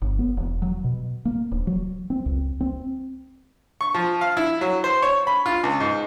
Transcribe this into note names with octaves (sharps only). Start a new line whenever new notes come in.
G1
B3
E1
F#3
B2
A#3
D1
F#3
C4
C#2
C4
C#6
F3
F5
E4
F#3
C5
C#5
B5
F4
C#2
G#2